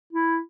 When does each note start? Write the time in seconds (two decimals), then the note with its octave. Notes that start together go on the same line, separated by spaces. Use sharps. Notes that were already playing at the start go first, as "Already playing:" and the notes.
0.13 E4